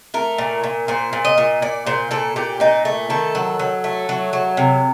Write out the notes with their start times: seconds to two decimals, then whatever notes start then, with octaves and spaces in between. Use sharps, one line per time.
0.14 A3 A#4
0.38 A#2
0.64 A#2
0.88 A#2 C5
1.13 A#2
1.25 D#5
1.38 A#2
1.62 A#2 D5
1.87 A#2 C5
2.11 A#2 A4
2.36 A#2 G4
2.60 A#2 D#4
2.85 A3
3.10 D#3 A4
3.35 F#3
3.59 F#3
3.84 A3
4.09 F#3
4.33 F#3
4.57 C3